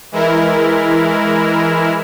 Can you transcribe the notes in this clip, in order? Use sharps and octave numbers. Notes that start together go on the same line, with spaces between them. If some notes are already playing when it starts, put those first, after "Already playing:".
E3 G#3 E4 A#4